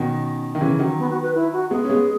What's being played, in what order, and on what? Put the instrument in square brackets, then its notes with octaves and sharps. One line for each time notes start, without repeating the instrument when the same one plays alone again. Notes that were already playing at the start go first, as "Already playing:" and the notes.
Already playing: [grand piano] B2 D#3 [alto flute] C#4
[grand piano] D#3
C#3 E3
D#3 F#3
[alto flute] B3
F#4
B4
E4
F#4
[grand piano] G#3 B3 [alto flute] G#4
[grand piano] C#4
G#3 B3